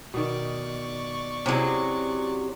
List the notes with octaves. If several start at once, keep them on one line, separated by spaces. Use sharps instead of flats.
B2 D#3 D5 C#6
C3 F#3 C#4 E4 G#4